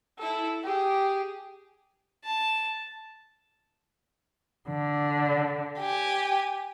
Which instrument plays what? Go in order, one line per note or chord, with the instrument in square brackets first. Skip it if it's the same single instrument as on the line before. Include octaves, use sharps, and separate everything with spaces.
[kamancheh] E4 A4
G4 G#4
[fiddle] A5
[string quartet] D3
G4 G#5